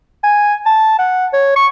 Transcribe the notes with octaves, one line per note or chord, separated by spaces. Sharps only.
G#5
A5
F#5
C#5
C#6